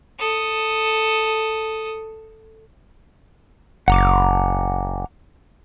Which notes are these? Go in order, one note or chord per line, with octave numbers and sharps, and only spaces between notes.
A4 D#6
F#1 F#5 A#5 D6